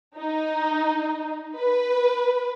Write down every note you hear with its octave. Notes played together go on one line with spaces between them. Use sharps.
D#4
B4